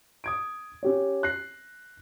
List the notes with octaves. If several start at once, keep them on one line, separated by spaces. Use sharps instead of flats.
D#6 G#6 D7
C#4 G4 C#5
F#6 A#6 C7